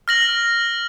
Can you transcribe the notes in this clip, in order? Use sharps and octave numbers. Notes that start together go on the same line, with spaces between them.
F6 A#6 F#7